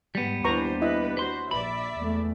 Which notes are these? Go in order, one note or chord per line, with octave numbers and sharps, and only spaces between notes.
G#2 G3 B3
D#2 E3 D4 B4 C5 A#5 C#6
E4 B4 D#5
F#4 B4 C5 C6
A#1 D5 E5 B5
E2 A3